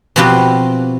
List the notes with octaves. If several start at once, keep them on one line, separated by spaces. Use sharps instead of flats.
B2 F3 C4 F#4 G4 B4